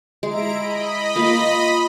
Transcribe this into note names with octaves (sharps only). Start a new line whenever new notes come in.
G#3 E4 A#5 D7
D#5 B5
A#3 F4